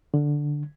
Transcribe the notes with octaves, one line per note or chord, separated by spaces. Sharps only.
D3